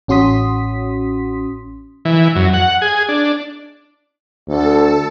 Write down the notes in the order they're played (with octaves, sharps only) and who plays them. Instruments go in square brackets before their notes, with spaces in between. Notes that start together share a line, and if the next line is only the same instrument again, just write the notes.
[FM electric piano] A1 C#4 F#4 C6 D#6 B6
[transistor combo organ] E3
F#2
F#5
G#4
D4
[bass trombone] D2 [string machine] A4